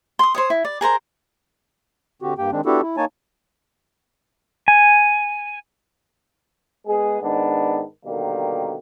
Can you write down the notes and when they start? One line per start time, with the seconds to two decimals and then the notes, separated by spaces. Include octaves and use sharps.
0.19 C6 D#6
0.35 C5 C#5 D#6
0.50 E4
0.65 D5
0.81 G#4 A#4 C5 A#5
2.22 D3 C4 F#4 G4
2.38 G2 A#3 G4 G5
2.52 D#3 G#3 C4 D4
2.66 B3 D4 E4 F#4 G4 A4
2.82 E4
2.97 A#3 D#4 C#5 G#5 A5
4.68 G#5
6.87 G#3 B3 G#4
7.22 G#2 D#3 B3 D4
8.06 B2 D3 D#3 G3 A#3